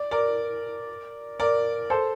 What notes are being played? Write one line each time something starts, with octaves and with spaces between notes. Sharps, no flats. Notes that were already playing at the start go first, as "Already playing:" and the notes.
Already playing: D5
A#4 D5
A#4 D5
A4 C5